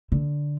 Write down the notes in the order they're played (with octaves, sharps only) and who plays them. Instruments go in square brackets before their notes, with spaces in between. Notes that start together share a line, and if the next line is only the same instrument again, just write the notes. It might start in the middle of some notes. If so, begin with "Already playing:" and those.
[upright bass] D3